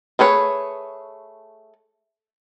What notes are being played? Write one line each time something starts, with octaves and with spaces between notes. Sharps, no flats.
A3 G#4 B4 C#5